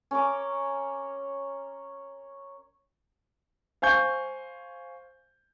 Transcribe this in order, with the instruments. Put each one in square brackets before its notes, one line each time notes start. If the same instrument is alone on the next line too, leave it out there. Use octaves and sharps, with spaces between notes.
[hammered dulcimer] C#4 A#4 D6
[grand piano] C5 F5 G#5 C#6 G6